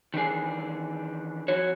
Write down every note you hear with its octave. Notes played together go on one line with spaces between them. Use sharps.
D#3 E3 D4 G#4
F2 F#4 C#5